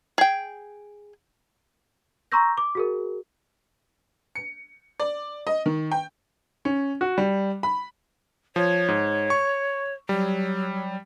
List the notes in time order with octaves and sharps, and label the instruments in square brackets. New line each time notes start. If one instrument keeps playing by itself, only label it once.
[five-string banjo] G#4 G5
[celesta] A#5 C6 C#6 E6 G6 A#6
D6
F#4 G#4 A#4
[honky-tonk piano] C#7
D5
D#5
D#3
G5
[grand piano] C#4
F#4
G3
B5
[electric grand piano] F3 [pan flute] C#5
[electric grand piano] G#2
C#6
[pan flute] F#3 [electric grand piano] G3